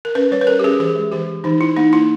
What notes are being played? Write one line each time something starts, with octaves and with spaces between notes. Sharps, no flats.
A#4
C#4 B4
G3 C#5
B4
C#4 A#4
G4
C#4 G#4
E3 G#4
G#3
E3 G4
E3
E3 D#4
E3 E4
A#3 D#4
A#3 E4